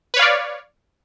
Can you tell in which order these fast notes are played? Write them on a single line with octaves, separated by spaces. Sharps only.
B4 C#5 F5 D5